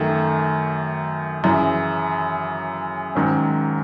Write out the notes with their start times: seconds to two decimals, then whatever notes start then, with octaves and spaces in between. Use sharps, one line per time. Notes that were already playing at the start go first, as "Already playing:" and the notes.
Already playing: F#2 D#3 A3
1.43 F#2 C#3 E3
3.15 G#2 D#3 F#3 C#4